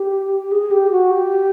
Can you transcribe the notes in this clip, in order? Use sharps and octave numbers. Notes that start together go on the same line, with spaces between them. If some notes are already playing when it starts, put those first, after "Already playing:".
Already playing: G4
G#4
G4
F#4
G4